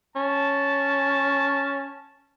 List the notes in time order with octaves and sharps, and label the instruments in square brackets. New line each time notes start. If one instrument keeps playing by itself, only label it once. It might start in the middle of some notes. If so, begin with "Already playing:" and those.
[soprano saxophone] C#4 [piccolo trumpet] A5